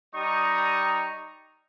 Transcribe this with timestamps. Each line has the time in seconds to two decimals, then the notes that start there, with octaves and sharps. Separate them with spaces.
0.14 G3 D#4 A#5 C#6 D#6